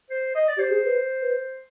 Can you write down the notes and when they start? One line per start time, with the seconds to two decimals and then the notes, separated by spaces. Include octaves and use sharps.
0.10 C5
0.35 D#5
0.48 D5
0.57 G4 C5
0.71 G#4
0.85 B4
1.22 B4